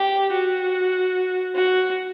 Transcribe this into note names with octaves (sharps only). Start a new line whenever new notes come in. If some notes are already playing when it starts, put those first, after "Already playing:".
Already playing: G4
F#4
F#4